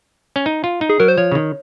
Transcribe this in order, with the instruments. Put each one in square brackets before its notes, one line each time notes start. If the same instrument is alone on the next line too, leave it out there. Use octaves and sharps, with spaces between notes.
[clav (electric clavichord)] C#4
D#4
F4
D#4
[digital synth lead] G#4
[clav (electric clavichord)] F#3 [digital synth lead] A#4
[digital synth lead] C5
[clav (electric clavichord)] F3 [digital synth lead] C#5
[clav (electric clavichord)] C#3
D#3